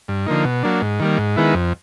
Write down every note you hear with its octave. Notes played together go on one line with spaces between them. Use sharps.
G2
D3 F3 A#3 D#4
B2
F#3 A#3 D4
G#2
D#3 G3 A#3
G#2
D#3 G#3 B3 E4
F2